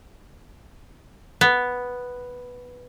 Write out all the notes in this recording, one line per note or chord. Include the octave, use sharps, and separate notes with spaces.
B3